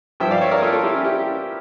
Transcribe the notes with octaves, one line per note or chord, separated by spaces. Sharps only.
G2 F3 E5 G5
D5 F5
C#5 E5
A#4 D5
F4 A4
F4 A4
E4 G4
C#4 E4
E4 G4